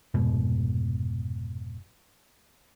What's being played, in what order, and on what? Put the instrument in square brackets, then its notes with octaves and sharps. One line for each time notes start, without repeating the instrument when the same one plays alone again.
[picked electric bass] F1 G#2 B2